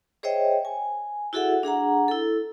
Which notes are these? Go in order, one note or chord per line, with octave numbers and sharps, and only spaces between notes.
G#4 C5 C#5 D#5 E5 G5
G#5
E4 F#4 G#4 A4 E5 F#5
D4 G#4 F#5 A#5
E4 A4